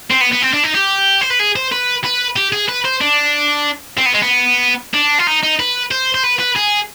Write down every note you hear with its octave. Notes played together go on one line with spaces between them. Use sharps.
C4
B3
B3
C4
D4
D#4
G4
C5
B4
G#4
C5
B4
B4
G4
G#4
B4
C5
D4
C4
B3
G#3
B3
D4
F4
D#4
D#4
B4
C5
C5
B4
B4
G#4